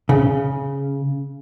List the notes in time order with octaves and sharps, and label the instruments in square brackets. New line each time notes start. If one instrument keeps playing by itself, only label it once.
[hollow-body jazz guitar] C#3